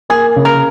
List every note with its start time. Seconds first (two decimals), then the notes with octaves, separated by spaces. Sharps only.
0.10 A#3 G#4
0.36 C#3
0.45 A#4